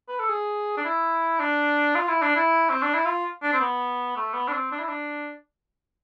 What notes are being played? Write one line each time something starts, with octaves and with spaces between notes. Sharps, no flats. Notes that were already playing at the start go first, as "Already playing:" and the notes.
B4
A4
G#4
D4
E4
D4
F4
E4
D4
E4
C4
D4
E4
F4
D4
C4
B3
A3
B3
D4
C4
D4
E4
D4